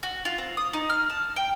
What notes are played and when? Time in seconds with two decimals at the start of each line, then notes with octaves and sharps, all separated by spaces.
0.03 F#4
0.25 F4
0.38 C4
0.57 D#6
0.73 D#4
0.89 F6
1.10 A5
1.36 G5